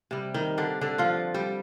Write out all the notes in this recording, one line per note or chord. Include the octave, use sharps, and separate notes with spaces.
C3 G3
D#3 D#4
D3 D4
D3 D4
F3 F4
G3 G4